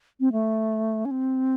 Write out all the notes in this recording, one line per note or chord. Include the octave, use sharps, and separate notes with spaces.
C4
A3
C#4
C4